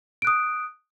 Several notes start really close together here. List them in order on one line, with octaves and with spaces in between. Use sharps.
D7 F#6 D#6